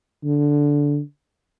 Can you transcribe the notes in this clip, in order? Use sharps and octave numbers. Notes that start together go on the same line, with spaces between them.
D3